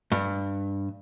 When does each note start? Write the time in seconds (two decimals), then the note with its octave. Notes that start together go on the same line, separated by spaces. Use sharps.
0.12 G2